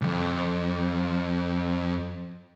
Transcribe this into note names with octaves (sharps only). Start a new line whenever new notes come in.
C2 F2